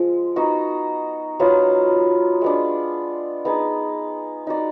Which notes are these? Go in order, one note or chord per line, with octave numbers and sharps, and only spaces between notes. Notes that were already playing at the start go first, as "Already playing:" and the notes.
Already playing: F3 G#3
B3 D#4 F#4
F#3 B3 F4
G#3 B3 D4
B3 D#4 G#4
D#4 F#4 D5